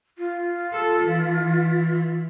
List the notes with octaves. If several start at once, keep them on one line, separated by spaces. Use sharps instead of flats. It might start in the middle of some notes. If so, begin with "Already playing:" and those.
F4
A4
E3